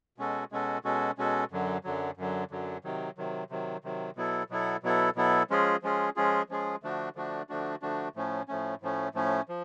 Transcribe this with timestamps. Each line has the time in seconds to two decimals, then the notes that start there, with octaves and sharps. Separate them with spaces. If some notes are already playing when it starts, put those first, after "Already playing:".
0.18 B2 G#3 C#4 F#4 A4
0.52 B2 G#3 C#4 F#4 A4
0.85 B2 G#3 C#4 F#4 A4
1.18 B2 G#3 C#4 F#4 A4
1.51 F#2 D3 F#3
1.84 F#2 D3 F#3
2.17 F#2 D3 F#3
2.51 F#2 D3 F#3
2.84 C3 D#3 F#3
3.18 C3 D#3 F#3
3.50 C3 D#3 F#3
3.84 C3 D#3 F#3
4.16 B2 F#3 B3 E4 A4
4.50 B2 F#3 B3 E4 A4
4.83 B2 F#3 B3 E4 A4
5.16 B2 F#3 B3 E4 A4
5.50 F3 G#3 C#4 F4 G#4
5.82 F3 G#3 C#4 F4 G#4
6.16 F3 G#3 C#4 F4 G#4
6.49 F3 G#3 C#4 F4 G#4
6.83 D3 F3 A3 D4 F#4
7.16 D3 F3 A3 D4 F#4
7.49 D3 F3 A3 D4 F#4
7.82 D3 F3 A3 D4 F#4
8.16 A2 F3 A3 C#4
8.48 A2 F3 A3 C#4
8.82 A2 F3 A3 C#4
9.15 A2 F3 A3 C#4
9.49 F3